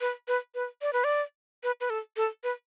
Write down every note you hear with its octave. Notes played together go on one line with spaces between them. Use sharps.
B4
B4
B4
D5
B4
D5
B4
B4
A4
A4
B4